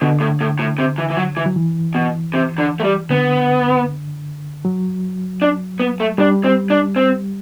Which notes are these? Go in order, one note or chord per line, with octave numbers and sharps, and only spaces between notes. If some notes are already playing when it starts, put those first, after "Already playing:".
B2 D3
A2
A2
A2
C3
E3
E3
F#3
E3
F#3
E3
B2
C3
D3
A3
G3
D3 B3
F#3
D4
B3
A3
G3 D4
C4
D4
C4